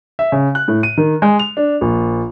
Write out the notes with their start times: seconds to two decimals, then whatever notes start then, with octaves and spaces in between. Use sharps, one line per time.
0.19 E5
0.32 C#3
0.55 F#6
0.68 A2
0.83 D#7
0.97 D#3
1.22 G#3
1.39 F7
1.57 D4
1.81 A#1